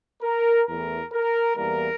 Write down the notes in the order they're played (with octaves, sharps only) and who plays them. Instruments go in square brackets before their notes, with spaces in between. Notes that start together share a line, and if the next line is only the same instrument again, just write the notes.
[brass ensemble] A#4
E2 E3 A3 A#4
A#4
E2 E3 G3 A#3 A#4